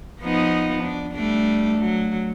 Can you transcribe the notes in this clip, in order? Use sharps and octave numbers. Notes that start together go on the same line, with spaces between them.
F3 B3 D#4
D4
G3 A3 D4
F#3